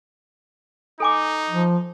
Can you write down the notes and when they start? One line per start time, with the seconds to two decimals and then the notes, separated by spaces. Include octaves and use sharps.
1.00 D#4 A4 G#5 D6
1.50 F3